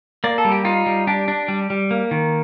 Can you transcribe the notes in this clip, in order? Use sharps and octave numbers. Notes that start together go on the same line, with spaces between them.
A#3 D5
A4
G3
G4
D#4 F4
G3
D4 G4
D4
G3
G3
A#3
D#3